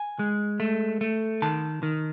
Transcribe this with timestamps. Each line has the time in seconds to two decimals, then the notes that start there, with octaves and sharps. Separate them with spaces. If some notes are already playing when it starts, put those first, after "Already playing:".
Already playing: G#5
0.19 G#3
0.60 A3
1.01 A3
1.42 D#3 A5
1.83 D#3